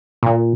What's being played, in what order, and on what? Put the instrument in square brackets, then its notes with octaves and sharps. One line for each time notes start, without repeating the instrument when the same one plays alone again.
[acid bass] A#2